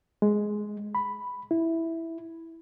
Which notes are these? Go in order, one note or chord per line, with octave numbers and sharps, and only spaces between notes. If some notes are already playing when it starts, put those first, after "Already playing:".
G#3
B5
E4